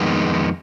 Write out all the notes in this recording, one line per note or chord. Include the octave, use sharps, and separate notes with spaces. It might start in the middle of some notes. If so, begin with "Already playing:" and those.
Already playing: F2 D#3 G#3 B3